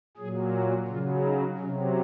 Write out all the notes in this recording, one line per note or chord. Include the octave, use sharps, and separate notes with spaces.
A#2 F#3 G#4
F#4
C#3 F#3 F4
D#4
C3 F#3 C#4